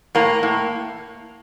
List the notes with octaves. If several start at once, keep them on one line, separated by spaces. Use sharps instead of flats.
A2 A#3
A2